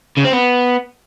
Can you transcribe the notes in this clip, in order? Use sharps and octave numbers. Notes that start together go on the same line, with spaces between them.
C#3
C4
B3